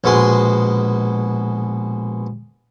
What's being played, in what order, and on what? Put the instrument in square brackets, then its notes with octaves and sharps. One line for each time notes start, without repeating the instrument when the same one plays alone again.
[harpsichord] A#1 B2 G#3 C6